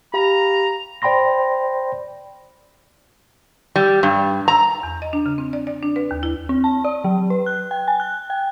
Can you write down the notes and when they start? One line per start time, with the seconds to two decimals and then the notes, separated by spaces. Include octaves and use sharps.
0.14 G4 F5 A#5 B5
1.02 C5 D5 G5 B5 C6 A#6
3.76 G3
4.03 G2
4.48 A#5
4.83 E2
5.02 D#5
5.13 D4
5.26 C#3
5.38 C4
5.53 D5
5.67 D5
5.83 D4
5.96 B4
6.11 D#2
6.23 E4
6.49 C4
6.64 A5
6.84 D5
7.04 F#3
7.30 B4
7.46 F#6
7.71 G5
7.88 G#5
8.00 F#6
8.30 G5